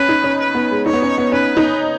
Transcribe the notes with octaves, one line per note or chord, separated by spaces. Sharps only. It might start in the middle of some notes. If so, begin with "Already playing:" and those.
Already playing: C#4 B4
D#4
C#4
B4
B3
G#3
D#4 C#5
B3
C#4
B3
C#4 B4
D#4